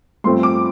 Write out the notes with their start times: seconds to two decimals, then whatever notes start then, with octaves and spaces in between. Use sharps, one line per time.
0.24 G2 F3 A3 C4 C6
0.43 D6